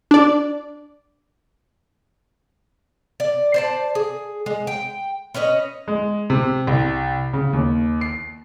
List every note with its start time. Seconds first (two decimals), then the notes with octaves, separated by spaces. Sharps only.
0.11 D4 D5
3.20 D5
3.54 C5 D5 A5
3.95 G#4
4.46 G#3
4.67 G5
5.34 C#4 B4 C#5 D#5
5.88 G#3
6.30 C3
6.67 C2
7.33 C#3
7.53 D#2
8.01 C7